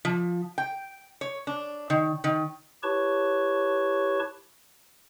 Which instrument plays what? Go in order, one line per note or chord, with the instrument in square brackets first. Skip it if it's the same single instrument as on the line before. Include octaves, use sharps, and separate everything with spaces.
[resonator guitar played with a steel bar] F3
G5
C#5
D4
D#3
D#3
[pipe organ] E4 G4 B4 C#5 A5 C#6